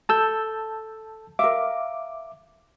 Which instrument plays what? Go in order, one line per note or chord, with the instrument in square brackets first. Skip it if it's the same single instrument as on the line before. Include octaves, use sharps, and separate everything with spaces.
[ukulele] A4 [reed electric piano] A5 E6 G6
[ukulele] A#4 F5 [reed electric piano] E5 D6